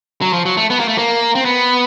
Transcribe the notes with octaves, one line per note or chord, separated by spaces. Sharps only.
F#3
F3
F#3
A3
B3
A#3
A3
A#3
C4
B3